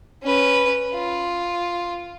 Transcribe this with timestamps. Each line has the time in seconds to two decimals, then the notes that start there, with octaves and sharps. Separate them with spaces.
0.23 C#4 B4
0.94 F4